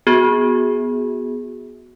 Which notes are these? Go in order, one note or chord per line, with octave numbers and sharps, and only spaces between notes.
B3 F#4 G#4